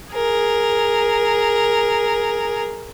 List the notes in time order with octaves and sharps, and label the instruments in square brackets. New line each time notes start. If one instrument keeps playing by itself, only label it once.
[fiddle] G#4 A#4